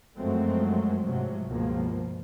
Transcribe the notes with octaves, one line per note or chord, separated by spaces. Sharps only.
F#2 F3 F#3 G#3 A3 C4
G#2 C3 F3 F#3
C#2 G2 B2 F3 A#3